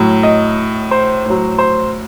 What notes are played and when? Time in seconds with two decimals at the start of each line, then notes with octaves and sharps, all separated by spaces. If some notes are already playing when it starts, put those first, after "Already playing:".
Already playing: A2 F#3
0.23 D#5
0.91 C5
1.25 A2 F#3
1.58 C5